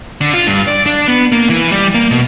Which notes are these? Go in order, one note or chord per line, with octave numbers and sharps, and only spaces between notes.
D3
F4
G2
D5
D4
B3
A#3
E3
G3
A#3
B2